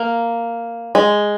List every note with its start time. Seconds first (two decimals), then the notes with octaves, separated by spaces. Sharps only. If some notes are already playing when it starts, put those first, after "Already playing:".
Already playing: A#3
0.95 G#3